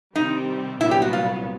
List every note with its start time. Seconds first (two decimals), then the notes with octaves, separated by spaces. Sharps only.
0.15 C3 D#3 G3 C4 D#4
0.80 C2 A#2 F#3 B3 E4
0.91 G4
1.02 F#4
1.13 F4